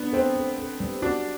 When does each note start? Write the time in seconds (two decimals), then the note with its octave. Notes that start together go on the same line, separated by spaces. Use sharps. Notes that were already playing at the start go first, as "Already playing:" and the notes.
Already playing: B3 D4
0.13 C4 A4
0.36 A4
0.58 A4
0.80 G3
1.02 D4 F#4